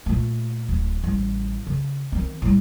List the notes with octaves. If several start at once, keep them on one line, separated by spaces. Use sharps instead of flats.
A#2 A3
D1
A1 G3
C#3
D#3 C4
A2 G3